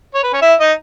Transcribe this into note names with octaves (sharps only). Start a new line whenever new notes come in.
C#5
B4
C#4 C#5
E4 E5
D#4 D#5